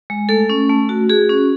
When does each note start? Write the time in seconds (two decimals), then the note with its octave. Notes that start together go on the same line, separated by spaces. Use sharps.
0.10 G#3
0.29 A3 A4
0.50 C#4
0.69 A3
0.89 F#4
1.09 F#4 G#4
1.29 C#4